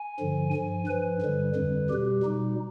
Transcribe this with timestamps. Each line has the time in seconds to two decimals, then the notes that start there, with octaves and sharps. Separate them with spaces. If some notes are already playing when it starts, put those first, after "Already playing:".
Already playing: G#5
0.20 G2 D3 F3
0.53 G2 F3 G#5
0.87 G2 F3 B4
1.22 G2 D3 G3
1.55 F2 D3 G3
1.90 B2 G3 G4
2.23 B2 G3 D#4